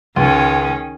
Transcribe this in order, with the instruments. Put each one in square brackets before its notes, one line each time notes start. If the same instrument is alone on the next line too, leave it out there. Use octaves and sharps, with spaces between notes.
[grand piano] C#2 [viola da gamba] D#3 C#4